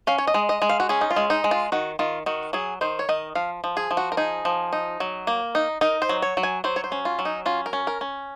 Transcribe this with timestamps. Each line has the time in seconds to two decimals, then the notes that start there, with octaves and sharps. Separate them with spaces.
0.07 C#4 F5
0.18 C#5
0.27 D#5
0.34 G#3
0.49 D#5
0.62 G#3
0.69 F5
0.80 F#4
0.89 C#4 G#4
1.01 D#4
1.11 F4
1.16 G#3
1.30 D#4
1.44 G#3
1.51 F4
1.72 D#3 F#4
1.99 D#3 F4
2.26 D#3 F#4
2.53 F#3 G#4
2.81 D#3 C5
2.99 C#5
3.09 D#3 D#5
3.35 F3 F5
3.64 F3
3.77 G#4
3.91 F3
3.97 F#4
4.12 A#4
4.17 D#4 G#4
4.45 F3
4.73 D#4
5.00 F#3
5.27 A#3
5.55 D#4
5.81 D#4 A#4
6.02 C5
6.09 F#3
6.22 C#5
6.37 F#3
6.43 G#5
6.64 F#3 C5
6.76 C#5
6.84 C5
6.92 C#4
7.05 F4
7.19 F#3
7.25 D#4
7.46 C#4 F4
7.66 A#4
7.73 C#4
7.87 A#4
8.01 C#4